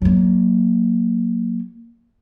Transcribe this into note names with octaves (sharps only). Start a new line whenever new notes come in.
F#3 A#3